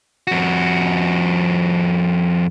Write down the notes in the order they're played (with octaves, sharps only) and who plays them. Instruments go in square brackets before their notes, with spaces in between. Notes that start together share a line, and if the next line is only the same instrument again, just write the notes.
[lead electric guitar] F2 F#4